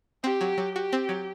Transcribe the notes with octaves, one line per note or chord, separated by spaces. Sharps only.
C4 G4
F#3
F#3
F#4 G4
C4
F#3